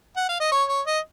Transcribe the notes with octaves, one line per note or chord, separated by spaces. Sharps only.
F#5
F5
D#5
C#5
C#5
D#5